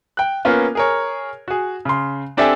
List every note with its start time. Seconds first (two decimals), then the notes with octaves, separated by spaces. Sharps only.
0.17 G5 F#6
0.45 A#3 B3 C#4 F4
0.75 G#4 A#4 C#5
1.48 F#4 G#4
1.85 C#3 C6
2.37 C4 D4 G4 A4 E5 G#5